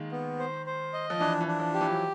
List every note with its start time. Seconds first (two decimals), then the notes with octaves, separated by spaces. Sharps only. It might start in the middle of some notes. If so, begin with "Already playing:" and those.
Already playing: D#3 G#3 A#3
0.12 B3
0.39 C5
0.66 C5
0.93 D#5
1.10 F3
1.19 E3 D4
1.41 E3
1.47 D4
1.60 F3
1.74 G4
1.81 E3
1.90 F#3